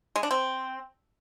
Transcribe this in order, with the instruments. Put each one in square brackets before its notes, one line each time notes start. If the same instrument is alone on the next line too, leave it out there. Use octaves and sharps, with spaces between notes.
[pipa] G#3
D4
C4